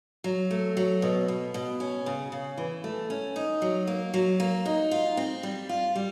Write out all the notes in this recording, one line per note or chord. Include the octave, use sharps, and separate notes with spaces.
F#3
A3
F#3
B2
B2
B2
C#4
C#3
C#3
E3
A3
C#4
D#4
F#3
A#3
F#3
A#3
D#4
F4
C4
G3
F4
G3